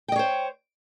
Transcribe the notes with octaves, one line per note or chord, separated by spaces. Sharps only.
C5 C#5 D#5 G5